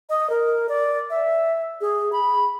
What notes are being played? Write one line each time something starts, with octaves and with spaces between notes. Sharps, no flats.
D#5
A#4
D5
E5
G#4
B5